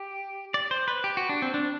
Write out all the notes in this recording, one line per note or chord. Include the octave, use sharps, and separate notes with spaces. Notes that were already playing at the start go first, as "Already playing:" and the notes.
Already playing: G4
D5
C5
B4
G4
F#4
D4
C4
D4